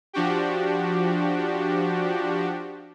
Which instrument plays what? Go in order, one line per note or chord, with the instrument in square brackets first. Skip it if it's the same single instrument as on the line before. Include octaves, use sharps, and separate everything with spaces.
[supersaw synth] F3 D4 F#4 G4